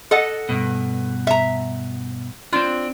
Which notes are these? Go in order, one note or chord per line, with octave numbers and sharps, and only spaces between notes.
A4 D#5 F#5
G2 B2
E5 A#5
C4 D4 F4